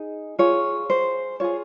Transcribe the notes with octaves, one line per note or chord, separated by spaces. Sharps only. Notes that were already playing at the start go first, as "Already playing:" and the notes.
Already playing: D#4 G#4
F4 G#4 C#5
C5
F4 G#4 C#5